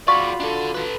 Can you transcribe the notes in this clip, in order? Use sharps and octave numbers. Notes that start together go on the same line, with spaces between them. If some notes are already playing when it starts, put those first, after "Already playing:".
F4 F#4 G#4 D5 B5 C#6
D4 A4
A4 B4